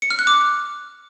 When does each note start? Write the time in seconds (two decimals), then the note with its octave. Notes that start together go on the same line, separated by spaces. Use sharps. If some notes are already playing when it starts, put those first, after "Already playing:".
0.02 C#7
0.10 F6
0.19 F#6
0.27 D6